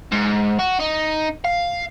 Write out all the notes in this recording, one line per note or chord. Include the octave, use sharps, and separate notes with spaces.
G#2
F#4
D#4
F5